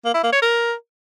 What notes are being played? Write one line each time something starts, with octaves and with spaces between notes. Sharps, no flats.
A#3
E4
A#3
C#5
A#4